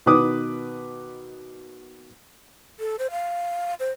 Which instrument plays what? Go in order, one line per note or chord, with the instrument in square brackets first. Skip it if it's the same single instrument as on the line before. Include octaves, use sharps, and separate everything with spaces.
[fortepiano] B2 D#3 B4 D6 D#6
[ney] A4
C5
F5
C5